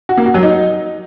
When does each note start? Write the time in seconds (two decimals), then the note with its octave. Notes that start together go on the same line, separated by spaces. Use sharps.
0.09 F#4
0.18 A#3
0.26 F#4
0.34 F#3
0.43 D#4